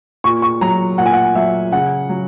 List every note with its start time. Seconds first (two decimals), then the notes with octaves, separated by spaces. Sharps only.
0.24 A#2 C#6
0.42 C#6
0.61 F#3 A#5
0.98 A#2 F#5
1.06 G#5
1.13 F#5
1.35 F#3 E5
1.72 C#3 F#5
2.09 F#3